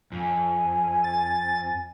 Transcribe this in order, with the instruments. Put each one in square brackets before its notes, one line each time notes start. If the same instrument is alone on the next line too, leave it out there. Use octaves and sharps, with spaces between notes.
[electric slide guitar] F2 [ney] G#5
[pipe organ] A6